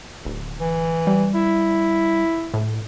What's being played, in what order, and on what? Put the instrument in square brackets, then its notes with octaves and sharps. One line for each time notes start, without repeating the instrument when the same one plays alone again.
[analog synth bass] D1
[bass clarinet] E3
[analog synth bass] G3
[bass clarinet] E4
[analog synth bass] A2